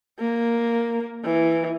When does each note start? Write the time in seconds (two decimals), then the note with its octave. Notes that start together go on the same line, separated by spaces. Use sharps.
0.19 A#3
1.25 E3